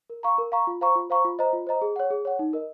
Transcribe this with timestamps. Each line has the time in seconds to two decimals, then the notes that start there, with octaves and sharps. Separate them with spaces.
0.10 A#4
0.23 F5 A#5 C#6
0.38 A#4
0.52 F5 A#5 C#6
0.67 F4
0.81 C5 F5 A#5 C#6
0.95 F4
1.10 C5 F5 A#5 C#6
1.25 F4
1.39 C5 D#5 A#5
1.53 F4
1.67 C5 D#5 A#5
1.82 G#4
1.96 C#5 F#5
2.11 G#4
2.25 C#5 F#5
2.39 D#4
2.53 A#4 D#5